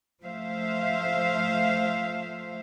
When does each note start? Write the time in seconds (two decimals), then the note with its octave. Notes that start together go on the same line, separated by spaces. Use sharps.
0.23 F3 A3 C5 E5 F5